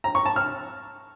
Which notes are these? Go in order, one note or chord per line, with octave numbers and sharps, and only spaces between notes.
A#5
C#6
A5
F6